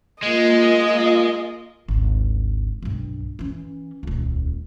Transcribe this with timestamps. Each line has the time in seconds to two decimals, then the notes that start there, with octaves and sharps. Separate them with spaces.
0.22 G#3 A#3 F4 D#5
1.88 G#1 D2
2.82 B1 G2
3.39 E3 C#4
4.03 D#1 C#2